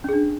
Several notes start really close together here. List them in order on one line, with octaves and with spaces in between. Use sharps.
C#4 G#4 D4